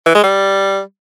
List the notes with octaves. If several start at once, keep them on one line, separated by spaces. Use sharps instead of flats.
E3
G#3
G3